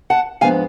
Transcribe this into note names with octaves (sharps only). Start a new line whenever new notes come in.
F#5 A5
G#2 F3 B3 D4 F5 G#5